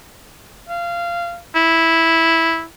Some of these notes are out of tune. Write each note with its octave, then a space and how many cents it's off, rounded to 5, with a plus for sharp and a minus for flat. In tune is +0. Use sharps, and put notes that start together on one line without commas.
F5 -20
E4 -10